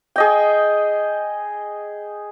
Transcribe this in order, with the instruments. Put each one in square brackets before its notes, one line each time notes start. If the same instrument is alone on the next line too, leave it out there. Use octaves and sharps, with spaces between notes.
[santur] G#4 D#5 G5